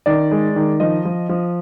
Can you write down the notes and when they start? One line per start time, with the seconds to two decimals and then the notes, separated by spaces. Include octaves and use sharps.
0.06 D#3 D5
0.31 G#3
0.56 D#3
0.80 F3 D#5
1.05 F3
1.29 F3